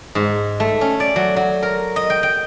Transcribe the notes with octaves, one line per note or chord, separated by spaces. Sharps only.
G#2
A3
C#4
D5
F#3
F#3
A#4
D#5
G5
G5